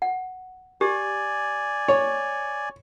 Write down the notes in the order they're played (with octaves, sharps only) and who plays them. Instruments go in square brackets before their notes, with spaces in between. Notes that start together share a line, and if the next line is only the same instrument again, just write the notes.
[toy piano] F#5
[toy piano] G4 [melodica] D5 G#5
[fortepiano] C#5